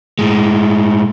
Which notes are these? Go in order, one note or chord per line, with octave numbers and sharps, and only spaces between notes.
A2 G#3